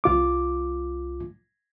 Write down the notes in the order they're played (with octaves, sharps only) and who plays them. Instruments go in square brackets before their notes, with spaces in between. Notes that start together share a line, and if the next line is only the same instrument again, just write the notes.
[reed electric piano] C2 F4 D6